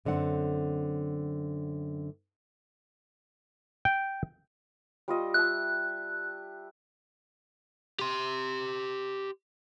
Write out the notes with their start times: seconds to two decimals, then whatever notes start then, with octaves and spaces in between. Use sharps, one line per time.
0.05 F#2 D3 C4 F#5
3.85 G5
5.08 G3 F4 D#5
5.34 E5 A5 F#6
7.99 G4 C6